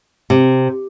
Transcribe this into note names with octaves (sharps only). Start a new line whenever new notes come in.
C3